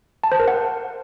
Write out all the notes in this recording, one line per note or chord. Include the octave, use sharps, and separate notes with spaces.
A5
C5
A#4
F#5